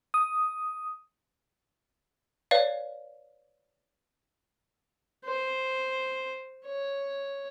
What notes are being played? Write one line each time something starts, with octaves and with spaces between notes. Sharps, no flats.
D#6
B4 C#5 D5 F5
C5
C#5